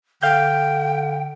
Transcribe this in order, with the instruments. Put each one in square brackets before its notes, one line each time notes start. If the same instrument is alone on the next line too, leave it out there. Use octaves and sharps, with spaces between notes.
[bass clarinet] D3 [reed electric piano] F5 G6 [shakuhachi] G5